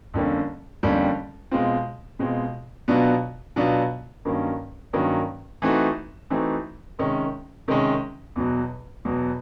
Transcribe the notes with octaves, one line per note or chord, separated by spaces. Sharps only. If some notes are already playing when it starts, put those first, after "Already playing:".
F2 D3 G3 A#3 C#4
F2 D3 G3 A#3 C#4
B2 G#3 C4 F4
B2 G#3 C4 F4
B2 F#3 B3 D4 F4
B2 F#3 B3 D4 F4
G2 D#3 F#3 A#3 C#4
G2 D#3 F#3 A#3 C#4
E3 A3 C4 D#4 F#4
E3 A3 C4 D#4 F#4
C3 D#3 G#3 C#4
C3 D#3 G#3 C#4
E2 B2 F#3
E2 B2 F#3